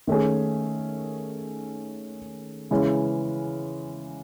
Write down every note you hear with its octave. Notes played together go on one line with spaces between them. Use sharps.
D#3 A3 C#4 G#4
C#3 E3 G#3 C#4